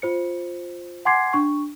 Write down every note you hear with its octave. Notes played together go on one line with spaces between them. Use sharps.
F4 C5 C#7
F#5 G#5 C6 D6 G#6 C7
D4 C#6